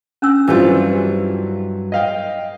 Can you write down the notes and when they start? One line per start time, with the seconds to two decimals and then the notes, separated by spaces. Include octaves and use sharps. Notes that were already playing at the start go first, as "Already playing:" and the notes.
0.22 C#4 D4 E6
0.48 G2 E3 F#3 G3 C4 F4
1.92 D#5 F5 G5